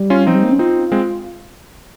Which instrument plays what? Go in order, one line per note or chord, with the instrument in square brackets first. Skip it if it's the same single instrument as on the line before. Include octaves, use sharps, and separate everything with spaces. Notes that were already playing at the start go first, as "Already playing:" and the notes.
Already playing: [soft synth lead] G3
[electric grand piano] C#4 F4
[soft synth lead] F3 [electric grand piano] C4 D#4
[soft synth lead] G3
A#3
C#4
[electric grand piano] C4 D#4 [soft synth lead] F4
[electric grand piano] G#3 C4